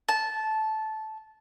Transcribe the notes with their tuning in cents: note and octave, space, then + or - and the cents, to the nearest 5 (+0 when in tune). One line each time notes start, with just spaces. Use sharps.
A5 -15